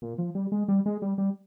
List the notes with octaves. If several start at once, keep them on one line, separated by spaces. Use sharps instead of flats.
A#2
F3
G3
G#3
G3
G#3
G3
G3